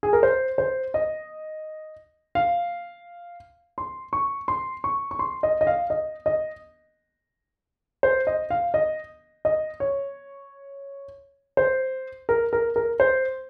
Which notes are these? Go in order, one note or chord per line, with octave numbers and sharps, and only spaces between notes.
G#4
A#4
C5
C5
D#5
F5
C6
C#6
C6
C#6
C#6
C6
D#5
D#5
F5
D#5
D#5
C5
D#5
F5
D#5
D#5
C#5
C5
A#4
A#4
A#4
C5